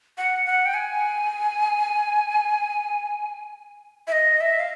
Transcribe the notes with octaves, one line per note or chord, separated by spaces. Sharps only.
F#5
F#5
G5
G#5
E5
D#5
E5
F5